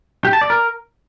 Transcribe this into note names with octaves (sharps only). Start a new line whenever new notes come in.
G4
A5
D5
A#4